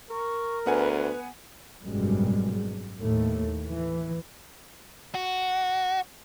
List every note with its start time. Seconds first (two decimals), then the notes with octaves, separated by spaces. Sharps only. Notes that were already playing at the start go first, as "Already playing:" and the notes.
0.11 A#4 C#6
0.66 D2 B3 B4 F#5 G#5
0.97 B4
1.84 G#1 F#2 B2 G3 G#3
3.00 D#2 A2 A3
3.67 E3
5.15 F#4